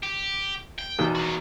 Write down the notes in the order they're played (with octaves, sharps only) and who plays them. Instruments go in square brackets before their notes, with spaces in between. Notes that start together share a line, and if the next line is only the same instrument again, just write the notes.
[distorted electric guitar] G4
G5
[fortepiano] E2 B2 D#3
[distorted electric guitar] A#3 F#4